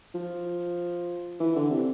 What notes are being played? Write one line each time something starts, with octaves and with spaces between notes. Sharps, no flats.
F3
E3
D3
C3